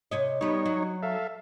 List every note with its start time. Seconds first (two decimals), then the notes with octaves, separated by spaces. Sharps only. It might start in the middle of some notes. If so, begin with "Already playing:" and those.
0.11 C3 C#5 D#5
0.41 G3 B3 D#4 C#5
0.66 F#3
1.03 A4 E5 F5